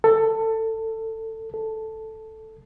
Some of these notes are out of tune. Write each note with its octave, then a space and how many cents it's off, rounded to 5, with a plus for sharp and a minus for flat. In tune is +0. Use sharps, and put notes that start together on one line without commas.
A4 +20
A4 +0